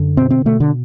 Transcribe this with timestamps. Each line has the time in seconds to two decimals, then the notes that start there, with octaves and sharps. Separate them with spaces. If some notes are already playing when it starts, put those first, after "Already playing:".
Already playing: F#2 D3
0.17 B2 C4
0.30 C4
0.45 B2 A3
0.60 D3